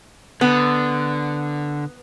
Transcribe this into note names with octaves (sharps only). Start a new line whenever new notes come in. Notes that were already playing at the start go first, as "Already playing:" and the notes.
D3 B3